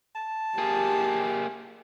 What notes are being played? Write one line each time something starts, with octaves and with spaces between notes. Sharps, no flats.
A5
A#3 G4 G#4